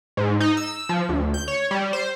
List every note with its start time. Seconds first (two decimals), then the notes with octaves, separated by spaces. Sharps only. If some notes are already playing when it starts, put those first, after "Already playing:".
0.17 G#2
0.40 D#4
0.57 E6
0.89 F3
1.09 D2
1.34 G6
1.48 C#5
1.71 G3
1.93 C5